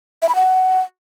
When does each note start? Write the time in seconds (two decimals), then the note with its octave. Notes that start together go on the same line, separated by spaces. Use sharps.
0.22 E5
0.29 B5
0.35 F#5